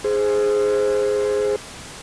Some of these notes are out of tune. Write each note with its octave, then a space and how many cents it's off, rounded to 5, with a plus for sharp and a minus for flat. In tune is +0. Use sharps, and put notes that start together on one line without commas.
G#4 +0 C5 +0